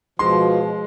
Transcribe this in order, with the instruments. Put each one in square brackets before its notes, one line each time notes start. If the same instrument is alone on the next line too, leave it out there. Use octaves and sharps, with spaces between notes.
[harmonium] B2 F3 [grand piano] G#3 C6